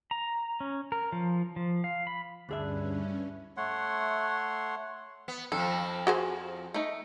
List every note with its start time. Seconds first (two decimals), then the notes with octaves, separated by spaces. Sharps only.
0.11 A#5
0.60 C#4
0.92 A#4
1.12 F3
1.56 F3
1.84 F5
2.07 B5
2.49 D2 G2 C#4 D4 E4 G#4 B4 E5
3.57 A3 C#5 F#5 C6
5.28 B3
5.52 F2 F3 A4
6.07 F#4 G#4 C5
6.74 A3 D#4